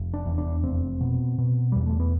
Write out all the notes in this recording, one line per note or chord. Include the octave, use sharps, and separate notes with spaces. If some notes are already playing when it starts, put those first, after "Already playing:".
Already playing: F1
D4
E2
D4
F1 C4
B2
B2
E2 G3
A3
B3